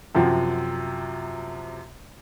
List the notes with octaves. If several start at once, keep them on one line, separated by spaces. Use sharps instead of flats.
F#2 C3 F3 F#3